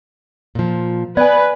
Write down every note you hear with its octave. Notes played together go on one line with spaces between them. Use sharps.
A#2 F3
B3 B4 D5 G#5